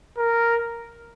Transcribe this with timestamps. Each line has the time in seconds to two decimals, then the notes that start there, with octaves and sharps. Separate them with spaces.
0.18 A#4